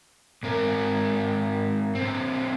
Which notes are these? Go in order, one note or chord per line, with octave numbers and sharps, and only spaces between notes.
G#2 C4 A#4
D3 C4